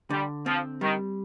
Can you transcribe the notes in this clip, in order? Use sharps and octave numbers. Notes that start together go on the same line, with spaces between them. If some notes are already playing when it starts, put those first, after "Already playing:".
D3 G3
F3 C4
D#3 G3